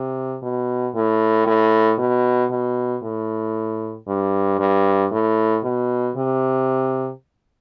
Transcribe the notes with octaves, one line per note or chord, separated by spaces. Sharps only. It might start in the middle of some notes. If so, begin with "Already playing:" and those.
Already playing: C3
B2
A2
A2
B2
B2
A2
G2
G2
A2
B2
C3